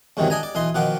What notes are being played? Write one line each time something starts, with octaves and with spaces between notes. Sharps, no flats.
E2 G#2 C3 D#3 E3 F#3
D4 D#5 G#5 A#5
D5
B1 E3 D#5 C6
B2 D#3 F3 F#5 D6